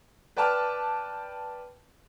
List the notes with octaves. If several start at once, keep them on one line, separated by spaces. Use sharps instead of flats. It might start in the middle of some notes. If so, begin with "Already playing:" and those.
B4 D5 G5 A5 D6 F6